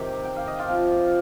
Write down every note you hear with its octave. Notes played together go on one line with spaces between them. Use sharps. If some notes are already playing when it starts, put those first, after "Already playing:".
Already playing: C3 D#3 G4
G5
F5
D#5
F4 F5
C3 F3